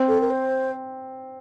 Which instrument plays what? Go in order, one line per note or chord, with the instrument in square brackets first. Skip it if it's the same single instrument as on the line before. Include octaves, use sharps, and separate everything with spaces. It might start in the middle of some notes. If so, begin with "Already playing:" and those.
Already playing: [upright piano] C4
[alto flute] A4
A#4
C5